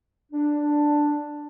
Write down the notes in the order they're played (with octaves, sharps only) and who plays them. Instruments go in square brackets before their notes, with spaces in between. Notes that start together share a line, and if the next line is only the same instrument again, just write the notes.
[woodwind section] D4